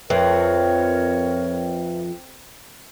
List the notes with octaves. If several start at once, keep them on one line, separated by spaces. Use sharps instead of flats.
F2 A#4 B4 C#5 E5 G5